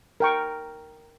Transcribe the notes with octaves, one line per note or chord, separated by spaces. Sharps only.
A#4 G5 C#6